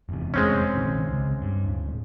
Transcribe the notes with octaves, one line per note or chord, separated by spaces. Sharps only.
F1 E2 C3
G#3 C4 C#4
A#1 C3 D#3
C#2 C#3
G2
D1